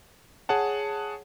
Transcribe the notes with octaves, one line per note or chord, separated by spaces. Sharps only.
G#4 C#5 F#5 A5